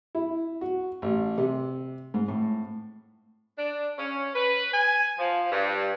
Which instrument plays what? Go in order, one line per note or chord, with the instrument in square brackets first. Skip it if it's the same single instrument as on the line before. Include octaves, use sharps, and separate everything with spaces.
[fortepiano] E4
F#4
A1
C3
G#2
A2
[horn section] D4
C#4
B4
G#5
F3
G2